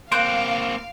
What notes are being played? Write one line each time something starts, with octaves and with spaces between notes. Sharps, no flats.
A#3 C4 F5 C6 F#6 G6 D7